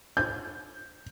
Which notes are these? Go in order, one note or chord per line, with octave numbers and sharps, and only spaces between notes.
G6